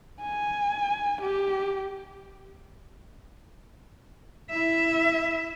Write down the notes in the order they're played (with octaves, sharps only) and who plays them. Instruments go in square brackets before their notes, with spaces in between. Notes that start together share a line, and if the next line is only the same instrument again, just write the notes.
[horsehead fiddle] G#5
G4
[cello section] E4 [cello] E5